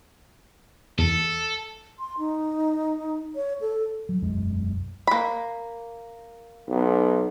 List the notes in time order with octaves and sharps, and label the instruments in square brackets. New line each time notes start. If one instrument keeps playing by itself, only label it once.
[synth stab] E2 [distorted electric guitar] A4
[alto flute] C6
D#4
C#5
A4
[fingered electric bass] F#3
E1 B1 F#2 G#3
[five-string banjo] A#3 B5
[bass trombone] B1